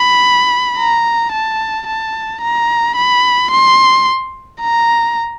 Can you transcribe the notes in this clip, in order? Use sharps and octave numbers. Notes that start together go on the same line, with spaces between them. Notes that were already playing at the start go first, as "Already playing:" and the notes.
Already playing: B5
A#5
A5
A5
A#5
B5
C6
A#5